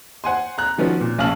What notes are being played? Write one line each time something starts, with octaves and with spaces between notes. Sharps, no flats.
C5 F#5 G#5 C6
A#5 F#6
D#3 F3 B3 C#4 F#4
A#2
A#1 C#4 F5 A5 F6 F#7